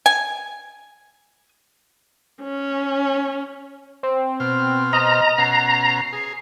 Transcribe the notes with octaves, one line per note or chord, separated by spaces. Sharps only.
G#5
C#4
C4
B2 C5 F6
D#5 A#5
B2 C#4 F#5 C7
G#4